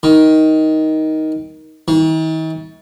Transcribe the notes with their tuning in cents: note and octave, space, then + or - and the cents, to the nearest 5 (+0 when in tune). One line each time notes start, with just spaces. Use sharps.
D#3 +10
D#3 +45